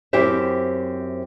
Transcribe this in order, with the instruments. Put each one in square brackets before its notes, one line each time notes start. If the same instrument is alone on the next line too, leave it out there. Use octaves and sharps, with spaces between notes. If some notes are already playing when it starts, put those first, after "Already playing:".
[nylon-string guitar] F#2 C4 E4 G4 C5 E5